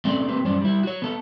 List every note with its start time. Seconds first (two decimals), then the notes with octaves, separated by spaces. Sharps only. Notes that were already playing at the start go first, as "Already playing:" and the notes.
0.05 A3 C4 C#4 A4 D5
0.28 A#3 C4 G4 B4
0.44 F#2 G3 C#4 C5 D5
0.62 G3 E4
0.83 F#4 C#5
1.02 B3 A4